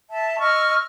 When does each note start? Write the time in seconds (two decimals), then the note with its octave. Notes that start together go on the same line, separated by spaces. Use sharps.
0.10 E5 A5
0.40 D#5 C#6 E6 F6